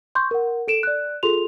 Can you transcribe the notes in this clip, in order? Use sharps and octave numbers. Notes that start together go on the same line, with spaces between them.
C6 C#6 G6
A#4 F#5
A4 D7 E7
D5 F#6
F4 G#4 A4 C6 F7